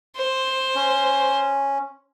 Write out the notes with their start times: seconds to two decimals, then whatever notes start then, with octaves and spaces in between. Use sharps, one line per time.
0.16 C5
0.75 C#4